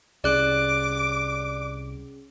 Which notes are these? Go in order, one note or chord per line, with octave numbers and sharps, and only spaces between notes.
C2 C#4 G#4 D5 D6 F#6